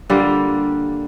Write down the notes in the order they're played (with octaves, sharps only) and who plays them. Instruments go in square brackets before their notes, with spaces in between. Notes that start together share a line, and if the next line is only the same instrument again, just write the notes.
[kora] D3 G3 A#3 F4